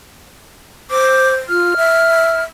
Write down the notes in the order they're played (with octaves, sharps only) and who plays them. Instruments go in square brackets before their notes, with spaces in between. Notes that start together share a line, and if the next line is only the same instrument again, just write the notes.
[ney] C5 [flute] D6
[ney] F4 [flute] F6
[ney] E5